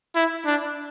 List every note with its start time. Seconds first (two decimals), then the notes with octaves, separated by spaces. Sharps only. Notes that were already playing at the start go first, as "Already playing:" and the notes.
0.15 E4
0.46 D4